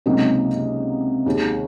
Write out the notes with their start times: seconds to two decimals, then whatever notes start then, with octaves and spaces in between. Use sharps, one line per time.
0.06 C#2 C3 F#3 A#3 D#4
1.26 D#2 D#3 G#3